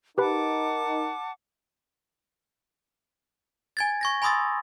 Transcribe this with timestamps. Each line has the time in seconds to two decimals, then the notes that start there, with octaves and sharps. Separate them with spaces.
0.18 D#4 G4 A#4 B4 F#5 A5 B5 D6
3.77 G#5 G#6 A6
4.01 C#6 G#6 A#6
4.22 G#5 B5 C6 D#6 E6 A6